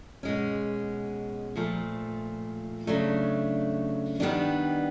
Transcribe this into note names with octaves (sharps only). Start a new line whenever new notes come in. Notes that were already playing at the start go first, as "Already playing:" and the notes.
B2 G#3 C#4
A#2 F3 A3
C#3 F#3 A3 D4
D#3 G3 B3 D4